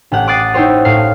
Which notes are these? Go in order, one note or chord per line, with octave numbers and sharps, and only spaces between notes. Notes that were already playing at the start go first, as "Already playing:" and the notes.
A1 G4 F#5
D6 D#6 F#6 A6 C7 D#7
D#4 E4 G4 C5 C#5
A2 F5 C7